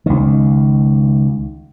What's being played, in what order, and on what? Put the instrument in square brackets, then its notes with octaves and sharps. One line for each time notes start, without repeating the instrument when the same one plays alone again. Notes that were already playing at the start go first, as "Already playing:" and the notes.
[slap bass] C#2 D#3